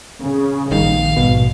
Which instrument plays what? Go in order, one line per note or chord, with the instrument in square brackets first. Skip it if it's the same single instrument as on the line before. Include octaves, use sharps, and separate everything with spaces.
[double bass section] C#3
[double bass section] A#1 [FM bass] D#3 [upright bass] G3 C4 [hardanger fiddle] F5
[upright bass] G#2 B3 [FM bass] B2